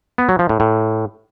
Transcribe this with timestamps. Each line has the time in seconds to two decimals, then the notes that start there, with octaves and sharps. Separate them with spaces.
0.18 B3
0.29 F#3
0.39 F3
0.49 A2
0.60 A2